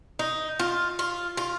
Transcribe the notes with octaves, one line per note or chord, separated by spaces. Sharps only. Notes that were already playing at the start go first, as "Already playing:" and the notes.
D#4
F4
F4
F4